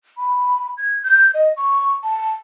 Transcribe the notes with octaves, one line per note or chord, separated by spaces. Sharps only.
B5
G#6
G6
D#5
C#6
A5